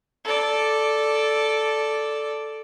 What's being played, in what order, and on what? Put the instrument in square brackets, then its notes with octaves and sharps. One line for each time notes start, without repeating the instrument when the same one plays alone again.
[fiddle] A4 D5